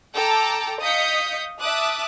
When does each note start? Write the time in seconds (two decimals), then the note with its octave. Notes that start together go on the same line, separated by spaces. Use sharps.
0.14 A4 G5 A5 A#5 D6
0.80 D#5 F5 D#6 G6 B6 C#7
1.60 E5 A5 D6 D#6 F#6